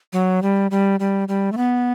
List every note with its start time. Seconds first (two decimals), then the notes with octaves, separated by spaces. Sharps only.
0.13 F#3
0.42 G3
0.71 G3
1.00 G3
1.28 G3
1.52 A3
1.57 B3